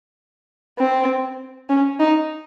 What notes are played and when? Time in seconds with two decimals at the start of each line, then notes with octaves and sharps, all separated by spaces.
0.78 C4
1.69 C#4
2.00 D#4